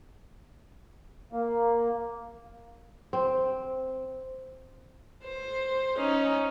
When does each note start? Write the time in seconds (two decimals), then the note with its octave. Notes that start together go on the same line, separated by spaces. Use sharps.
1.33 A#3
3.13 C4
5.23 C5
5.97 C#4 D#4